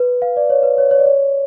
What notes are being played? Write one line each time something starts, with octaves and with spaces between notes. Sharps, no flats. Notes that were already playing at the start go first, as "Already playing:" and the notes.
Already playing: B4
F5
D5
C#5
B4
C#5
C#5
D5
C#5